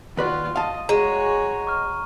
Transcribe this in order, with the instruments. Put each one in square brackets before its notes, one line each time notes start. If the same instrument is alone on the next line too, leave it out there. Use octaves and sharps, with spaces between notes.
[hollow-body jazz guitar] D#2 B4 D5 [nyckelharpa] F4 F#4
[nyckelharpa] D#5 [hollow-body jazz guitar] F5 A5
[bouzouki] G#3 [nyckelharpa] F#4 C#5 [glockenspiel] A#5 D#7
[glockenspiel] C#6 F6